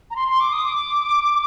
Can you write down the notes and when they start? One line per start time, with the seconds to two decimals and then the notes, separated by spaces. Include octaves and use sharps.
0.11 A#5
0.16 C6
0.28 C6
0.40 D6
0.53 D#6
0.65 D6